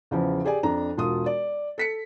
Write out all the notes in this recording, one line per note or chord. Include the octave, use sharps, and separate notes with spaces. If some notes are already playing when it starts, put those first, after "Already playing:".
E2 C#3 F3
G4 G#4 D5 G#5
F2 D4 A#5
E1 F4 F#4 D#6
D5
A4 B6 C#7